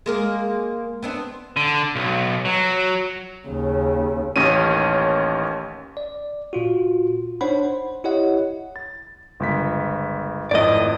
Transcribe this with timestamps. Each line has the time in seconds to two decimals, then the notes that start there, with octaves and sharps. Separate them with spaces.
0.06 G#3 A#3 A#4
1.03 B3 C4 D4
1.57 D3
1.96 B1
2.45 F#3
3.48 D#2 C#3
4.36 A1 D#2 C#4 D#7
5.97 D5
6.53 A#2 F4 F#4
7.41 D4 D#4 C5 C#5 F#5 B5
7.65 C5
8.04 E4 G4 C#5 D#5 F#5
8.76 A6
9.40 G1 C#2 B6
10.51 G#1 F2 A2 D5 D#5